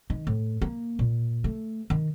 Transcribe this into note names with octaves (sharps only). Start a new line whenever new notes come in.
D#3
A2
A#3
A#2
A3
D#3